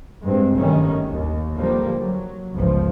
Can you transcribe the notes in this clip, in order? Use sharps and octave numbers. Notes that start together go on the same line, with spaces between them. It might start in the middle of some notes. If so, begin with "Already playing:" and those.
G2 G#3 C4
G1 F#2 D#3 G3 A3 C#4
D#2
D3 F3 G3 A#3
F#3
G1 C#2 G2 F3